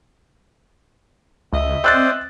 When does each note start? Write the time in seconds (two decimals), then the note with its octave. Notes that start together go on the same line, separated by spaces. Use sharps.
1.53 C#2 D#5 E5
1.84 C4 C5 D5 E6 F#6 A6